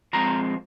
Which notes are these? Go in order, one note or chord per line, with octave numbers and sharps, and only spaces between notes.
F3 G#3 C4 A#5